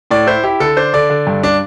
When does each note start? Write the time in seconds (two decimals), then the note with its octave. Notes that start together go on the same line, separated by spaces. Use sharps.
0.11 A2 D5
0.27 E4 C5
0.43 E4 G4
0.60 D3 A4
0.77 D4 C5
0.93 D3 D5
1.10 D3
1.27 G2
1.43 D4